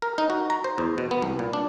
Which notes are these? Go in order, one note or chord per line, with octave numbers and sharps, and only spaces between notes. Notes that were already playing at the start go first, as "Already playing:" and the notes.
A#4
D#4
F#4
A#5
C5
E2
B2
B3
C2
A#2
D4